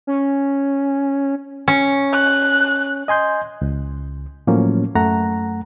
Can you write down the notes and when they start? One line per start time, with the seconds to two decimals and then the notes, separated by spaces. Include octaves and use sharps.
0.07 C#4
1.68 C#4
2.14 F#6
3.08 D#5 G#5 C6 G6
3.62 C#2
4.47 A2 F3 F#3 A#3 C#4
4.95 F#2 A3 F#5 A#5